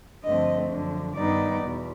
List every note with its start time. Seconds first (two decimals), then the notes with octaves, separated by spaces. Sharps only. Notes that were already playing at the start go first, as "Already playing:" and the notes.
0.23 G2 D3 F3 A3 C4 D#5
0.71 F#2 D3 F3
1.16 G2 D#3 G3 B3 D#4 D5
1.63 E2 B2